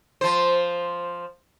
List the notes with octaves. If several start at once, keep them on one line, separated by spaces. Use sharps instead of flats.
F3 C5